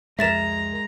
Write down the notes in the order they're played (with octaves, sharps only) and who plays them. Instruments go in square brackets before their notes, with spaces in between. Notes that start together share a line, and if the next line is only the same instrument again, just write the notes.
[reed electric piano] C2 F2 A#4 [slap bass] G#3 [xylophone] E5 A6 E7 [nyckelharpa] A#5